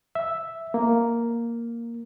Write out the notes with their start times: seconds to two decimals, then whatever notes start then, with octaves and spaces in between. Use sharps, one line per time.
0.15 E5
0.74 A#3